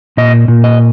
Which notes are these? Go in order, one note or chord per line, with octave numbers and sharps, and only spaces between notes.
A#2 D#5
A#2
D#5